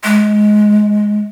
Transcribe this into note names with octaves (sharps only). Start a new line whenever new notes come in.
G#3